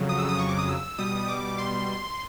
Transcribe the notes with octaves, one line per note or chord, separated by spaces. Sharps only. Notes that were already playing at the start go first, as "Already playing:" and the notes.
Already playing: F2 C#3 F#3
D#6
E6
D#6
C#6
D6
D#6
E6
B2 G3 D#6
D6
C6